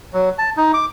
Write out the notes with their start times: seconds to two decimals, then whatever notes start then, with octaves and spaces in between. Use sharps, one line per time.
0.13 F#3
0.38 A5
0.57 D#4
0.74 D6